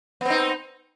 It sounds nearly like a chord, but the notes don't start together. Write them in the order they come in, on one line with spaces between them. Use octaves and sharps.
B3 C4 D#4